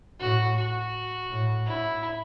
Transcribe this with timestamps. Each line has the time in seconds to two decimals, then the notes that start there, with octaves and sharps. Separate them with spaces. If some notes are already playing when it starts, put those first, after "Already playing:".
0.20 A2 F#4
0.56 F#4
1.30 A2
1.66 A2 E4